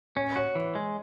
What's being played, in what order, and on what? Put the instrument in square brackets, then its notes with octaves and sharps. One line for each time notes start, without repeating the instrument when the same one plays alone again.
[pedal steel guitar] C#4 [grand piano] C#5
[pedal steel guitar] F#4 [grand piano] C#5
[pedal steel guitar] E3
G#3